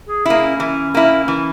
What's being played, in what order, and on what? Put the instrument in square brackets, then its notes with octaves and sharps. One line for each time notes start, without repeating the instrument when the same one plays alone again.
[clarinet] G#4
[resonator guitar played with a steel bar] A#3 E4 [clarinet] G#4
[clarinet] C#4
[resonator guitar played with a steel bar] E3
A#3 E4
E3